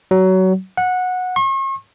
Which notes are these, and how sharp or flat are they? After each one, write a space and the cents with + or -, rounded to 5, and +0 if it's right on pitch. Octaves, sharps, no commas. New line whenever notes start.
F#3 +20
F#5 -15
C#6 -45